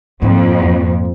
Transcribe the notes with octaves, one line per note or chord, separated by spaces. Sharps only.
F2 G#2 A#3